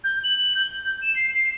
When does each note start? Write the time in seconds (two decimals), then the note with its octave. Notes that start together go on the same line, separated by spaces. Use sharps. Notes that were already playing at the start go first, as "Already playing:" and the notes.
0.04 G6
0.24 F#7
0.55 G6
1.02 E7
1.16 C7
1.35 C7